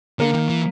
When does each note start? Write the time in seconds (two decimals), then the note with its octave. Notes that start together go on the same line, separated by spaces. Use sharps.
0.19 D3 A#3 A#4
0.34 D#3
0.50 E3